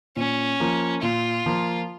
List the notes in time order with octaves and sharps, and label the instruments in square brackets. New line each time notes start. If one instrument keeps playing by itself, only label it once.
[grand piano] A#2 [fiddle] C#4
[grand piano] F3 A#3
[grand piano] A#2 [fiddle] F4
[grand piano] F3 A#3